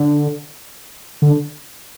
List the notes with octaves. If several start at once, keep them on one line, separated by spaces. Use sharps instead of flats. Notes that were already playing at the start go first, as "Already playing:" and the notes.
Already playing: D3
D3